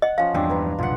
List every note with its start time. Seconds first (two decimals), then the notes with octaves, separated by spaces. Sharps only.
0.02 D#5 F#5
0.18 F3 C#4 F5
0.34 E2 G2 C4 D4
0.50 B4 A#5
0.79 F1 B1 F4 F#5